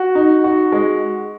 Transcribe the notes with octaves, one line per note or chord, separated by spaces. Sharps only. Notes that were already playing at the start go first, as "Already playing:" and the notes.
Already playing: F#4
D#4
F#4
G#3